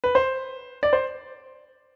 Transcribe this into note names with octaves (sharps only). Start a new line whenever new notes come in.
B4
C5
D5
C5